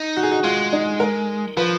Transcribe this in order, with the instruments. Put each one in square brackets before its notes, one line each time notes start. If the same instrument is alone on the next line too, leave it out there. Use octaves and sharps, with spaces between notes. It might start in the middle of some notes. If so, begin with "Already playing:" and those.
Already playing: [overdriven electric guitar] D#4
[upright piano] F#4
G#4
F#4
[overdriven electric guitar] G#3 [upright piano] F4
[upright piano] D#4
A#4
[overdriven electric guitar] F3 [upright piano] B4